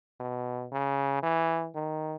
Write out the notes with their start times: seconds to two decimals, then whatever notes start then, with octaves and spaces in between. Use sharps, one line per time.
0.20 B2
0.72 C#3
1.23 E3
1.75 D#3